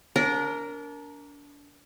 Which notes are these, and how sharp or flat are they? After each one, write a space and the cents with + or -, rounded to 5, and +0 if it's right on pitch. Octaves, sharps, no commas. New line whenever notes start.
D4 -30 A#4 +0